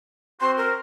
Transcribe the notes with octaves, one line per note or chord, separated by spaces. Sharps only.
C4 F#4 C5 C6
A#4